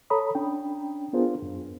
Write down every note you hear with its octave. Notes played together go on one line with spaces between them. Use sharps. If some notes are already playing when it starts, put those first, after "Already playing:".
A4 C#5 A#5 B5 D#6
C#4 D4 G5
B3 D4 F4 G#4 A#4 C5
F#2